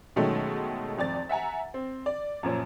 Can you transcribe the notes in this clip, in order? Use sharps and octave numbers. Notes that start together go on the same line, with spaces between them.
B2 D#3 F#3 G#3 A3 C#4
G#1 F2 D5 A6
E5 F#5 G#5 A#5
C4
D5
F#2 A#2 F3 C#4